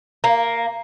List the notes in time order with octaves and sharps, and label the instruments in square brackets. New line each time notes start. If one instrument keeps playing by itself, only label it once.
[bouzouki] A#3